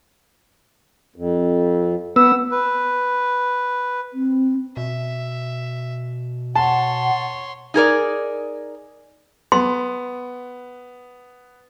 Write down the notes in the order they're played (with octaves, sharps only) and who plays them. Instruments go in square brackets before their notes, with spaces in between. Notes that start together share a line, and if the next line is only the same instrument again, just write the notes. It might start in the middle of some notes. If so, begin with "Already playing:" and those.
[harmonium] F2
[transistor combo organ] B3 [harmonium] F#5 [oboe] E6
[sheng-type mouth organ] B4
[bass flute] C4
[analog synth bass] B2 [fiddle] E5
[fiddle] C#5 C6 [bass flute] F#5 [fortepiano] A5
[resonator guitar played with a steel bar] D#4 G#4 A#4 D5
[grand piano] B3 [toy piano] C6